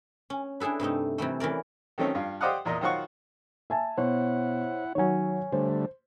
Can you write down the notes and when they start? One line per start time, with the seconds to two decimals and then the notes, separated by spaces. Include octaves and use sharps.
0.30 C#4
0.60 D4 E4 G#4 A4 B4
0.80 G2 C3 A3 D#4
1.18 C3 E3 G3 A3
1.40 E3 C#4 A#4 D5
1.98 D#3 F#3 A3 C4 C#4
2.15 G2 F4
2.41 G4 C5 D5 D#5 F5 F#5
2.65 E2 A#2 A#4 D#5
2.81 D#3 F#3 F4 C5 F#5 C#6
3.70 E5 G#5 A5
3.98 B2 E4 C5 C#5 F#5
4.95 D#3 F#3 C#5 G#5
5.52 D3 G3 A3 C5